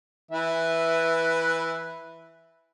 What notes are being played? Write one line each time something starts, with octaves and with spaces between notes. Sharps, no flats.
E3 B4 E5